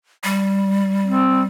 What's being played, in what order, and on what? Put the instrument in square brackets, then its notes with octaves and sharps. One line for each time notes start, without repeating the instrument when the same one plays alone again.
[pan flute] G3
[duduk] C4